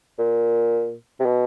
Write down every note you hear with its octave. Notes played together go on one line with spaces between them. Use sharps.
A#2
C3
B2